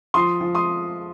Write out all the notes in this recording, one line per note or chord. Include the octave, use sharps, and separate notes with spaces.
F3 C6 D#6
F3
C6 D#6